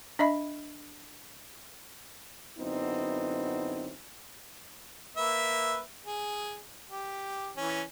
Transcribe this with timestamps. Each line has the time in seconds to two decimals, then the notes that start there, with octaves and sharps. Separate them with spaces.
0.19 D4 D#5 E5 B5
2.59 F#2 D3 B3 C4 D#4 E4
5.17 A#3 B4 E5
6.05 G#4
6.90 G4
7.56 E3 C#4